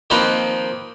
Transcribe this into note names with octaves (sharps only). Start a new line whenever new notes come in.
D#3 F3 A#3 C4 D#4 B4